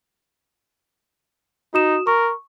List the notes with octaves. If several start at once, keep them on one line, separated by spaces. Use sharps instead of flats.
D#4 F#4 D#6 E7
A#4 C#6